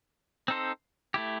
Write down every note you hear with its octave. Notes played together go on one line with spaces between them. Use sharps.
C4 D#4 A4 C5
A3 E4 G4